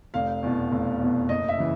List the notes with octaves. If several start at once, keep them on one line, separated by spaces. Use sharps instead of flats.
F1 F5
E2 B2
F1
E2 B2
F#1 D#5
E5
C#3 E3